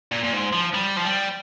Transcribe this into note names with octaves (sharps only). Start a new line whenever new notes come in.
A#2
A#2
G#2
F3
G3
F3
G3